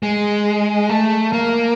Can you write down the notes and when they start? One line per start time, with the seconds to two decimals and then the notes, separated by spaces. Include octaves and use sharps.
0.03 G#3
0.89 A3
1.33 A#3